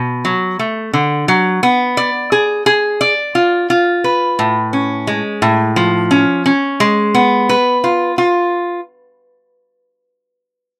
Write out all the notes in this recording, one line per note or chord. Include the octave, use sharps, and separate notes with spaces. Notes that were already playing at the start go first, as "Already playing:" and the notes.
Already playing: B2
F#3
A3
D3
F#3
B3
D5
G#4
G#4
D5
F4
F4
B4
A2
C#4
G#3
A2
F3
C#4
C#4
G#3
B3
B4
F4
F4